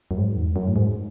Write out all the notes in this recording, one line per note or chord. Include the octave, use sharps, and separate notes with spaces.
F#2
G#2
E2
F#2
A2
G#2